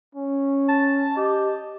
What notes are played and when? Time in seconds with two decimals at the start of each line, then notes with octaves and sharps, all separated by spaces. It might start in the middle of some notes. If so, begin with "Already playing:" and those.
0.15 C#4
0.68 A5
1.16 G4 D#5